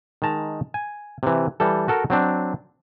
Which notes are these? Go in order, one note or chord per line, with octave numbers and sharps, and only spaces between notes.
D#3 G#3 A5 A#5
G#5
C3 E3
E3 G3 A4
F#4 A4 A#4
F#3 C4 D4